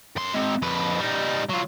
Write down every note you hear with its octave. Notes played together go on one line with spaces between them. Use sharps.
F#2 C6
G#3 C4
F2 B4
G3 D#4
F#3 F4